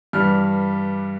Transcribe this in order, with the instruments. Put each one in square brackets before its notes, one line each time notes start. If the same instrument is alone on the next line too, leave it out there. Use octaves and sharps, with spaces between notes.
[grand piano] G2 E3 G3 F6